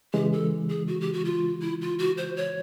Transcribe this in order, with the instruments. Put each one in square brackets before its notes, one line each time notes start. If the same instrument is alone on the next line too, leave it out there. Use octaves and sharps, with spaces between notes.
[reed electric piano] C#3 E3 G#3 [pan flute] G4
[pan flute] A4
G#4
F#4
G4
F#4
F4
E4
F4
F#4
C5
C#5